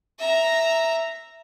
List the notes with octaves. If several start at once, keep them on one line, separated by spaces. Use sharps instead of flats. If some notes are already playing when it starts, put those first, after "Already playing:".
E5 A#5